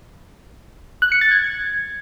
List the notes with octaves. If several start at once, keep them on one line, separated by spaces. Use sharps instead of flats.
F#6
C#7
A6
G#6